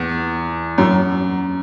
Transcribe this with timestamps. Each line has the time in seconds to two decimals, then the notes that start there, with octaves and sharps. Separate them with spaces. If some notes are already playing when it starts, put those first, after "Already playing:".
Already playing: E2
0.78 F#2